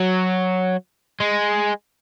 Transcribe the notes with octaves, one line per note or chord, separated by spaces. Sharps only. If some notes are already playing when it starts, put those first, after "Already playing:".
Already playing: F#3
G#3